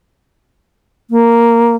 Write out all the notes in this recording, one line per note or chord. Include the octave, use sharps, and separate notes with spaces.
A#3